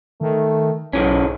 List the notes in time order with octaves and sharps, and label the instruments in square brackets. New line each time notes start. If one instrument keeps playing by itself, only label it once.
[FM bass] D#3 [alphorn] A3
[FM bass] B1 [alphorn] G#2 [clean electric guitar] C#3 E3 C#4